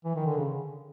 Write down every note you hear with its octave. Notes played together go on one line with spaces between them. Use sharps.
E3
D#3
D3
C#3